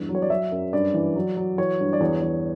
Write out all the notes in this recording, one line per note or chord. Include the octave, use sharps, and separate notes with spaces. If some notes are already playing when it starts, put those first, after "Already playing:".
Already playing: E2 G2
F#3
C#5
D5
F#3 E5
F#2
G2 D5
E3
F#3
F#3
E3 C#5
G2
D5
E2 C#5
E2